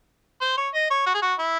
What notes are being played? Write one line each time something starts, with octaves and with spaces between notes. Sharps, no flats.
C5
C#5
D#5
C#5
F#4
G#4
F#4
E4